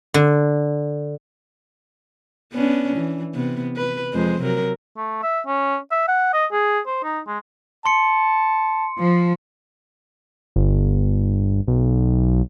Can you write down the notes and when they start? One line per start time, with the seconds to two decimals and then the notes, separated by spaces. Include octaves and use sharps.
0.14 D3
2.53 B3 C#4 D4
2.96 E3
3.34 C3 B3
3.76 B4
4.13 F2 G#3 C5
4.41 C3 F#3 A#4
4.97 A3
5.23 E5
5.47 C#4
5.92 E5
6.08 F#5
6.34 D#5
6.52 G#4
6.87 C5
7.03 D#4
7.27 G#3
7.86 A5 C6 C#7
8.98 F3
10.56 G1
11.68 B1